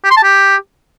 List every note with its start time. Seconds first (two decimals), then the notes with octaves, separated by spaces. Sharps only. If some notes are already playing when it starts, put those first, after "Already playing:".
0.04 G4
0.10 C6
0.17 A5
0.23 G4